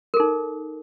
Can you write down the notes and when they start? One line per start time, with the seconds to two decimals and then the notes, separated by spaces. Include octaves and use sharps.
0.14 A#4
0.17 A4
0.20 D#4